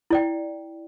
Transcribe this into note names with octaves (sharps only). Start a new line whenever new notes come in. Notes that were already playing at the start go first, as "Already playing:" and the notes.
E4 D5 G5